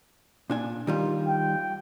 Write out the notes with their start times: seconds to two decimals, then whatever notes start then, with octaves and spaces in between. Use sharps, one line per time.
0.50 A#2 D4 G#5
0.87 D#3 G3 F4
1.27 G5